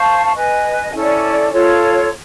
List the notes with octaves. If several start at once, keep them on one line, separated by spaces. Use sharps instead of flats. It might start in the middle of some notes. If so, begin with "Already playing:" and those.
Already playing: C5 F5 A5 C#6
B4 D#5 G#5
C#4 E4 A4 D5
F4 A4 C#5